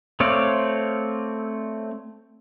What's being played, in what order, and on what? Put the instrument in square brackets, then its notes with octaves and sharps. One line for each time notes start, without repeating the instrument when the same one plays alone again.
[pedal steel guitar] A3 C4 C#5 D5 F5